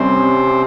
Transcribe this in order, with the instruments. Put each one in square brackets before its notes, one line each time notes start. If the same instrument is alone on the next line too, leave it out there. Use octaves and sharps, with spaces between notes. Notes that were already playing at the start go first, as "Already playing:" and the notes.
Already playing: [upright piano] C2 C3 G3 C#4 [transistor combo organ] C4